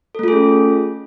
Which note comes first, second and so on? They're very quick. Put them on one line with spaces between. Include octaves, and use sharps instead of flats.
A4 A3 F4 G#4 C#4